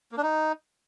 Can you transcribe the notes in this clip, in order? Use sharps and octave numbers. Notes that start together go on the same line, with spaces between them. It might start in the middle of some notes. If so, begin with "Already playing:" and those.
A#3
D4
D#4